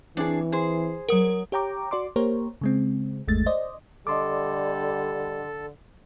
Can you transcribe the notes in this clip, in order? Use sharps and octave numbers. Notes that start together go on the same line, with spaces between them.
E3 C4 D4 G#4 C#5
G#4 C5
F#3 A#4 F#5 D#6
G4 C#5 G5 A#5 D6
F#4 D5 C6 D6
A#3 G4 A#4 C5 C#5
C#3 G#3 C4
G1 D#2 G#3 A3 A6
C5 D5 D#5
D3 G3 A4 D#5 C6 D6